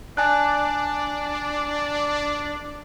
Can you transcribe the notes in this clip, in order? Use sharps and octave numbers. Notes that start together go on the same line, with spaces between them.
D4 G#5 A5 F#6